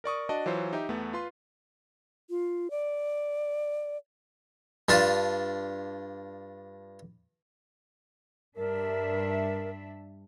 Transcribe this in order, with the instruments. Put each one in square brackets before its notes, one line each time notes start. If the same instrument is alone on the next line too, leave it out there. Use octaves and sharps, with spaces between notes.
[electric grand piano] A#4 D5 C#6 D#6
D4 F#4 D5 D#5 F#5 A5
E3 F#3 F4 C5 C#5
D#4 G4 E5
E2 A3 B3
F4 B4 C6
[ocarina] F4
D5
[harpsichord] G2 D4 F4 A5
[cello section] G2 D4 E5 [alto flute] A#4